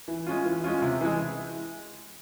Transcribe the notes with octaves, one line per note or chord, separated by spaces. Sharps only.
E3
G#3 C#4 F4
E3
G#3 C#4 F4
C3
E3 G#3